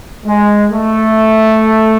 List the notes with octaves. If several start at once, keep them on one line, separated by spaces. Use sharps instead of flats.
G#3
A3